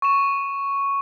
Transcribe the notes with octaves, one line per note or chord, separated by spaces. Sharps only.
C#6 E7